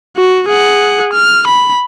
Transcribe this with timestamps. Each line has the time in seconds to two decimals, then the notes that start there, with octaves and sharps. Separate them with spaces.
0.17 F#4
0.48 G#4 F#5
1.13 F6
1.47 B5